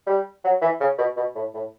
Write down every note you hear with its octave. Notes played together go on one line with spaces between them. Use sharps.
G3
F#3
E3
C#3
B2
B2
A2
A2